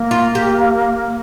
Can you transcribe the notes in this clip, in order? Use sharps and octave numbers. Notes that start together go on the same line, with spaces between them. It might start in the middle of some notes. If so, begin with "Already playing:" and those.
Already playing: A#3
F4
G4